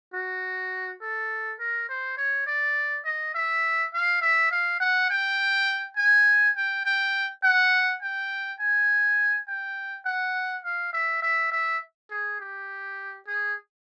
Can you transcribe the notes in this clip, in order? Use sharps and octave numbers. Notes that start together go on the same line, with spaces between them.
F#4
A4
A#4
C5
C#5
D5
D#5
E5
F5
E5
F5
F#5
G5
G#5
G5
G5
F#5
G5
G#5
G5
F#5
F5
E5
E5
E5
G#4
G4
G#4